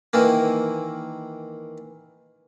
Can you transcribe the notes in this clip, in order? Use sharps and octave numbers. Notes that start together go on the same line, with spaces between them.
D#3 E3 A#3